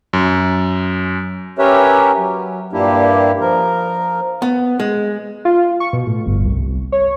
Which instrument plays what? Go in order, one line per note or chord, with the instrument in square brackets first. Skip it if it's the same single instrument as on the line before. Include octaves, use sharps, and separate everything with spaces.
[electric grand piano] F#2
[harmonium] C#4 G4 A#4 B4 C#5 E5
F#3
G2 A#2 A#3 D4 E4 G4
F3 A#4
[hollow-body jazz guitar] B3
G#3
[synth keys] F4
C#6
B2
A2
G1
C2
C#5